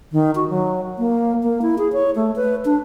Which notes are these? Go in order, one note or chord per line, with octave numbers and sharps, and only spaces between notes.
D#3
F#4
F#3
A#3
A#3
E4
G#4
C#5
A3
B4
D4